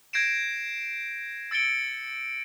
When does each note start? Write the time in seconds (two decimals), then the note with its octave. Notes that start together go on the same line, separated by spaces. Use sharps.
0.13 G6 G#6 A#6 C7 D7 E7
1.51 E6 A6 C#7 D7 G7